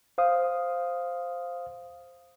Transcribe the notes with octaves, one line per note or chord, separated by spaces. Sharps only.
C5 F5 D#6